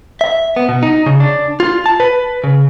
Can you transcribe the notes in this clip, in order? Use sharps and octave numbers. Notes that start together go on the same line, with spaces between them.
E5
B3
B2
D#4
C#3
D4
F4
A5
B4
C#3